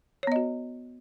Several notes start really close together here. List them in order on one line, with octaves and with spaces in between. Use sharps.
C#5 B3 D#5 F#4